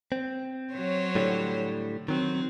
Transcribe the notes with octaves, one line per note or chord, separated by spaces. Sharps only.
C4
F#3 C5 C#5
A2 D3 G3
D#3 F#3 C4